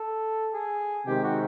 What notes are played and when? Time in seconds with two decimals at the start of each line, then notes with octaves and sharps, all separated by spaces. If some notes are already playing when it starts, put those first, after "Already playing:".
Already playing: A4
0.53 G#4
1.06 C3 D#3 G#3 C4 G4
1.23 F#4